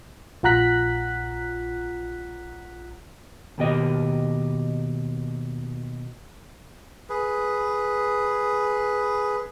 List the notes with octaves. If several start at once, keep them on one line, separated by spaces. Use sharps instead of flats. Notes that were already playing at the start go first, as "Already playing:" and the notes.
A#1 F4 F#5 A#5 F#6 B6
D#2 B2 G4 D#5
G#4 B4